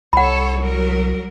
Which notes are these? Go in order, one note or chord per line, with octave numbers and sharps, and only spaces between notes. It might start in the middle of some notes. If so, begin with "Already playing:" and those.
C2 A4 C#5 F#5 B5
F#3 G3 A#4